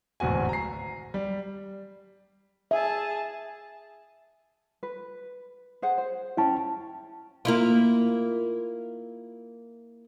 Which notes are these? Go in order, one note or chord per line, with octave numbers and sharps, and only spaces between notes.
D1 G#1 E2 F#4 G#5
A#5 C7
G3
G#4 E5 A5
B4
G#4 C5 F#5
C5
C#4 E4 G5 A5
A#3 E4 F4